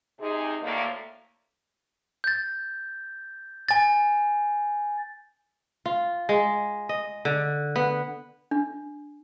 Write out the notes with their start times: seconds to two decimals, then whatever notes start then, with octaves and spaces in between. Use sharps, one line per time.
0.19 C3 D#4 G#4
0.62 D2 A2 A#3
2.24 G6 A6
3.69 G#5 A6
5.86 F4
6.29 G#3
6.89 D#5
7.25 D3
7.76 B3
8.51 D4